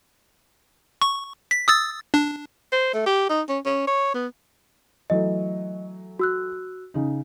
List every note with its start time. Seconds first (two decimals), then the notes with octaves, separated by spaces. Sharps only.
1.02 C#6
1.51 B6
1.68 D#6 E6 A6
2.14 D4
2.72 C5
2.94 A3
3.06 G4
3.29 D#4
3.49 C#4
3.65 C#4
3.87 C#5
4.14 B3
5.10 E3 F#3 A3 D#5
6.19 F#4 E6 F#6
6.94 C#3 D#4